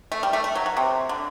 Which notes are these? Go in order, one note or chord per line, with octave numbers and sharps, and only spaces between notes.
A3
G3
A3
A3
F#3
F#3
C3
D3